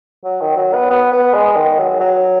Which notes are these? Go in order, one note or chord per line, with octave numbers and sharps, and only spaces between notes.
F#3
D#3
F#3
B3
B3
B3
G#3
D#3
F#3
F#3